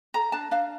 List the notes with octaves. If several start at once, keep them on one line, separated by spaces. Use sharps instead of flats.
A4 A#5
D4 A5
D4 F5